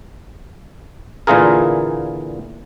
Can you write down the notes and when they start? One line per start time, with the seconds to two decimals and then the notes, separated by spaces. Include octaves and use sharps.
1.27 A#2 D3 E3 F4 G#4 A#4